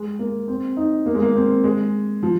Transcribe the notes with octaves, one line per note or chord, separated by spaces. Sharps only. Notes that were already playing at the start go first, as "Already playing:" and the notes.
Already playing: G#3
A#3
C4
D#4
A#3
G#3
A#3
C4
G#3
F3